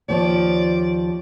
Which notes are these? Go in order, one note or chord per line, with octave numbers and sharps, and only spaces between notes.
D#2 F3 C#5 D5